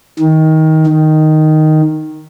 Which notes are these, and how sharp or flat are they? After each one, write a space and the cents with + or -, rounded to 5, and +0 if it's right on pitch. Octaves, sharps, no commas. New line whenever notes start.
D#3 +20
D#3 +0